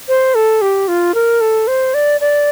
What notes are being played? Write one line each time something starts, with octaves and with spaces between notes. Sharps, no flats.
C5
A4
G4
F4
A#4
A4
C5
D5
D5